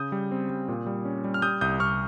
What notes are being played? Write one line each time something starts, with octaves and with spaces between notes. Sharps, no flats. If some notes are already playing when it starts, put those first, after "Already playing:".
Already playing: C#3 D#6 G6
G3
C4
G3
A#2
G3
C#4
G3
F6
G3 D#6 G6
C2 D#6 G6
C2 C#6 F6